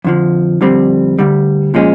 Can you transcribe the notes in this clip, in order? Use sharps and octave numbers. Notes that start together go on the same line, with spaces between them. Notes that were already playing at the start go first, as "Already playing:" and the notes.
F2 D3 F3
F2 D3 G3 C4
D2 D3 G3
A#2 F3 G#3 C#4